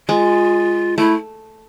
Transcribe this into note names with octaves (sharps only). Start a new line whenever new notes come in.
G#3 F4
A3 E4